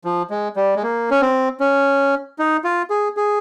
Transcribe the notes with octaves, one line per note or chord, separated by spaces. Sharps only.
F3
G#3
G3
G#3
A#3
C#4
C4
C#4
D#4
F4
G#4
G#4